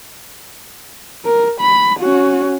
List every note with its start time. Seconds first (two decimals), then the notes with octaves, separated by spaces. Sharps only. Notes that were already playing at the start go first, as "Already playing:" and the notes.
1.25 A#4
1.61 B5
2.00 C#4 F#4